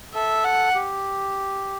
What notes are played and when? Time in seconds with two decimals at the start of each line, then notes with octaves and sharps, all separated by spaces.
0.14 A4 E5
0.44 F#5
0.75 G4